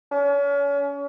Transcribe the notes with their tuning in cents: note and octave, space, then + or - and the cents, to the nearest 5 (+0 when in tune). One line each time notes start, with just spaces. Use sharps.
C#4 +35